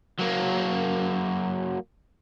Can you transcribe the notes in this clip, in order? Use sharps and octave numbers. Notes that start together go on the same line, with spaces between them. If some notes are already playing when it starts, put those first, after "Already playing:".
F#3 A#3